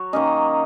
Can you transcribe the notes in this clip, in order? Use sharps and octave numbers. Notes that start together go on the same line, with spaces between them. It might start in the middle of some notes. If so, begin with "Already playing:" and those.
Already playing: F#3 C#5
D#3 A#3 C#4 D#5